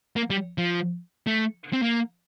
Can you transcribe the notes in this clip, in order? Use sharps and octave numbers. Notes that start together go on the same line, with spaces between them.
A#3
G3
F3
A3
C4
A#3